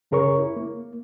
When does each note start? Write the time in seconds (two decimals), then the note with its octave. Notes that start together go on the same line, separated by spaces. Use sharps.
0.11 F#2 C#3 G#4 A#4 C#5 C#6
0.39 E4
0.56 A#3